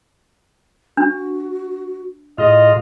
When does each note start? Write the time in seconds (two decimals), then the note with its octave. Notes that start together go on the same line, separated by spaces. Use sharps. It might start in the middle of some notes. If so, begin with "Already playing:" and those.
0.97 D4 F#4
2.38 A2 F4 G#4 D#5